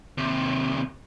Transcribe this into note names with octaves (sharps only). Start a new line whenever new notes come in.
D#2 C3